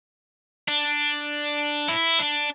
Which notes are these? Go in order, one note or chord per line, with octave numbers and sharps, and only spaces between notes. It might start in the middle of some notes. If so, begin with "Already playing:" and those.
D4
E4
D4